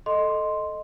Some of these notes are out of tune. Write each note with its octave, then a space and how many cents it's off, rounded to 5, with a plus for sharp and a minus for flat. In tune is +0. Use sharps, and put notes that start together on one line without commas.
A4 +0 D#5 +0 C6 +0